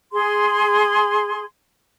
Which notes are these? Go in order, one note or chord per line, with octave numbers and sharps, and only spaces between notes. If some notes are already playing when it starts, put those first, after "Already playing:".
G#4 C6